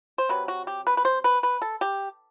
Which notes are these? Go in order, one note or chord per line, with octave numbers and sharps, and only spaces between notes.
C5
C3 F#3 B4
F#4
G4
B4
B4
C5
B4
B4
A4
G4